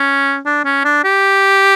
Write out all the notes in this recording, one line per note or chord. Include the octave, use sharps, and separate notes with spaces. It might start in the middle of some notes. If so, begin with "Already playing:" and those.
Already playing: C#4
D4
C#4
D4
G4